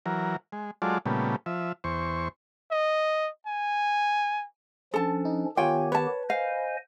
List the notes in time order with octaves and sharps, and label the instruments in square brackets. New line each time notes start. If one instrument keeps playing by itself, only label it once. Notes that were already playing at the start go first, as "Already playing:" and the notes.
[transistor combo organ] E3 F#3 A#4
G#3
F#3 G#3 F4 A4 D5
A#2 C#3 G3 A3 B3
F3 E5
E2 C5 C#6
[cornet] D#5
G#5
[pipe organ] F3 C#4 D4 [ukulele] A4 A5
[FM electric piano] D#4
[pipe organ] D#3 B3 G4 [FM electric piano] F4 C#5 G#5 [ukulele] G5
[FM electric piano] B4 [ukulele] C#5 A5
[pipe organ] C5 D#5 G#5 [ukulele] F5